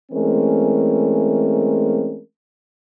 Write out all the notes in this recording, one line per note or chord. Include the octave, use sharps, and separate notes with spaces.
E3 G#3 A3 C4 C#4 A#4